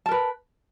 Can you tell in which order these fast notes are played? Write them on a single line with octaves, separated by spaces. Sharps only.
A5 A#4 B4